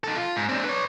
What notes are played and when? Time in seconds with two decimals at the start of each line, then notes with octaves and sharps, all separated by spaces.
0.04 D#4 A4
0.16 F4
0.36 G#2
0.49 C4 D4
0.64 B4 C#5